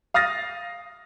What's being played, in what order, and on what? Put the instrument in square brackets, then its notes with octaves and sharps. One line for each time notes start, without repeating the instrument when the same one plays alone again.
[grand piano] F5 D#6 F6 A6 A#6